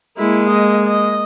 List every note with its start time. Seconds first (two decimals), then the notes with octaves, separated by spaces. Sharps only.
0.18 G#3 A#3 E4
0.49 D#5
0.86 D#5